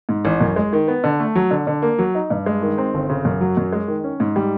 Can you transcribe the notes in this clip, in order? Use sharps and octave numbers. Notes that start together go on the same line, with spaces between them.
G#2
A1
F#2
G#3
D#3
B3
D3
A3
F#3
D3
D3
A#3
F#3
D#4
G2
G#3
D#3
C4
G1
C#3
F#2
F#3
F#2
G#3
D#3
C#4
G#2
G3